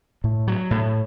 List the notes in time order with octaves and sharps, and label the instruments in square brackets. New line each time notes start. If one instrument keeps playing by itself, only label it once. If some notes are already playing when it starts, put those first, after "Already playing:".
[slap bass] A2
F#3
A2